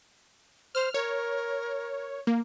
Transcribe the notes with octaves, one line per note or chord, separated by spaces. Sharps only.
C5 F6
A#4 C#5
A#3